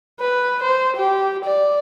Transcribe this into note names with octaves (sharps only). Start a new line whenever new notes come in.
B4
C5
G4
D5